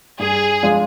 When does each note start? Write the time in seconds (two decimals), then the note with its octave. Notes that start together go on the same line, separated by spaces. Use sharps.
0.19 G2 G#4
0.63 F3 G#3 D4 F4